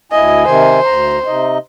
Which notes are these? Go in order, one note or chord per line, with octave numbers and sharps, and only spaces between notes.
D2 E4 D#5 G#5
C3 D#3 C5 G#5
D2 A#5
C3 D#4 D#5